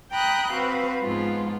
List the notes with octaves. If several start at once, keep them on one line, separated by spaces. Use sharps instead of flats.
G5 A#5 B5 D#6 F#6 G6
C4 F#4 B4 F5
G#2 F3 B3 F4